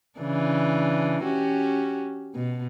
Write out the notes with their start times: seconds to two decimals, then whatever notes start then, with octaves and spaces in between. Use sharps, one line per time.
0.19 C#3 E3 D4
1.22 C#4 F#4 G4
2.35 B2